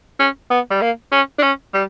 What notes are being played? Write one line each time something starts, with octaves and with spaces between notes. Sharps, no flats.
C#4
B3
G3
A#3
C#4
D4
C#4
G3